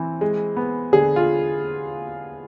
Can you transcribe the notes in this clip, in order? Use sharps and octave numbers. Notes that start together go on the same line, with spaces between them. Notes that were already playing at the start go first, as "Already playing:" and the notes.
Already playing: E3 C4
G#3
B3
D3 G#4
F4